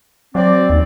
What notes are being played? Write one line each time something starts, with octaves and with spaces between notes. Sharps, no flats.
F#3 C4 D5
D#2